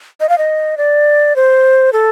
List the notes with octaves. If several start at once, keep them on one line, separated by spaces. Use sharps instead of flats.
D#5
F5
D#5
D5
C5
A4